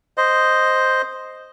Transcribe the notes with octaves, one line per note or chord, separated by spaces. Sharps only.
C5 D#5